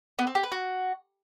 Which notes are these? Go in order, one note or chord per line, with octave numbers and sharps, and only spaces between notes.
B3
C4
G4
B4
F#4